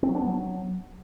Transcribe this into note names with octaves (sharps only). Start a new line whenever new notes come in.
C4
F#3
D4
B3
F#3